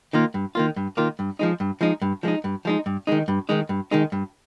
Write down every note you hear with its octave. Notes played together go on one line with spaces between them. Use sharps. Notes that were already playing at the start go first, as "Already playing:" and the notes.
D#3 A#3 F4
G2
D#3 A#3 F4
G2
D#3 A#3 F4
G2
F3 G#3 D#4
G2
F3 G#3 D#4
G2
F3 G#3 D#4
G2
F3 G#3 D#4
G2
D#3 G#3 D#4
G2
D#3 G#3 D#4
G2
D#3 G#3 D#4
G2